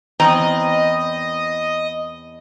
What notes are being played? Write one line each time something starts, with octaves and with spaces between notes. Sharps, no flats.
E2 C4 D#5 A#5